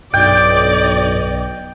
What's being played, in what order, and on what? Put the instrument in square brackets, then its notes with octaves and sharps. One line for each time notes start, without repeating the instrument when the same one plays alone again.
[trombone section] B1 [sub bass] G2 [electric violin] D5 D#5 [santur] G5